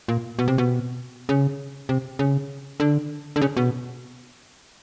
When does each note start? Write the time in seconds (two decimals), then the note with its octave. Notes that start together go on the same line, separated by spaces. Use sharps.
0.08 A#2
0.39 B2
0.48 C3
0.58 B2
1.29 C#3
1.89 C3
2.19 C#3
2.80 D3
3.36 D3
3.41 C#3
3.57 B2